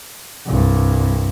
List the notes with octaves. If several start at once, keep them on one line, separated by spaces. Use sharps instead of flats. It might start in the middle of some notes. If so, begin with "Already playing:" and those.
C2 G2